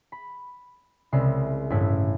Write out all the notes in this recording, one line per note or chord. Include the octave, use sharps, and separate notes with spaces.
B5
C2 C#3 G#3 E5 C7
A1 G2 E4 B6